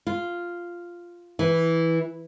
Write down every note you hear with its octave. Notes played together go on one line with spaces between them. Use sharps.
F4
E3